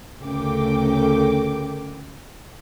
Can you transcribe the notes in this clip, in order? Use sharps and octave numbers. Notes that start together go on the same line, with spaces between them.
D2 C#3 A3 A#4 G5 D6